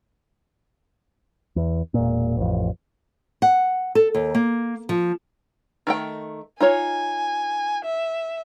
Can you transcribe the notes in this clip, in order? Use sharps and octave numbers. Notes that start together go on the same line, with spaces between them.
E2
E1 A#2
A1 F2
F#5
A4
D#2
A#3
F3
D#3 A3 G5
D#4 F4 C#5 G#5
E5